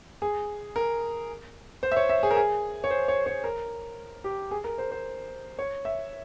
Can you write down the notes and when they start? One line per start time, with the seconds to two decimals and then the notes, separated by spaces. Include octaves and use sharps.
0.22 G#4
0.76 A#4
1.83 C5
1.92 E5
1.96 C#5
2.09 E5
2.23 G#4
2.31 A#4
2.36 G#4
2.84 C#5
2.90 C5
3.08 C#5
3.26 C#5
3.44 A#4
4.24 G4
4.51 G#4
4.64 A#4
4.78 C5
4.92 C5
5.59 C#5
5.85 E5